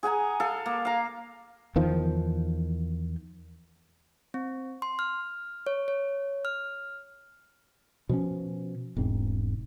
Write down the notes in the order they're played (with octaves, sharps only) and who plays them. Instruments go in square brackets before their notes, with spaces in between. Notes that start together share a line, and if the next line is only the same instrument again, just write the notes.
[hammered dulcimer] G#4 F#5 G#5 A#5
A4 F5
A#3
F5 A#5
[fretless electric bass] E2 D#3 F3
[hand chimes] C4
C6
F6
C#5
C#5
F6
[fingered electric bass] B2 F3 C4 C#4
E1 G#2 C4